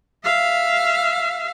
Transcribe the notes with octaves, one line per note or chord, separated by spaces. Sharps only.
E5 F5